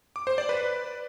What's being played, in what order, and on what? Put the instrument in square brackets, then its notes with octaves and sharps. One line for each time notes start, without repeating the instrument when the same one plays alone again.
[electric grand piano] D6
C5
D5
B4